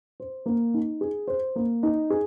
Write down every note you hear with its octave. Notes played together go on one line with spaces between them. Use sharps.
C5
A#3
D#4
G#4
C5
A#3
D#4
G#4